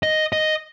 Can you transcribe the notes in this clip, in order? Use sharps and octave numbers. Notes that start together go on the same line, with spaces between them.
D#5
D#5